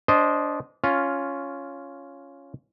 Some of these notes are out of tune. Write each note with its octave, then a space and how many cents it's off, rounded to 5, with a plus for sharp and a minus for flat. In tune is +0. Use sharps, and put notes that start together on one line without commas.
D4 -25 C5 +0 D#5 +0
C#4 +5 F4 +0